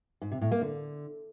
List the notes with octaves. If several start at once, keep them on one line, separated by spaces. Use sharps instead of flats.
G#2
C3
A2
A#3
D3